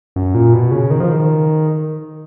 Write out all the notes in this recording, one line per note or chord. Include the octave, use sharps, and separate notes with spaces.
F#2
A#2
B2
C#3
D#3
F3
D#3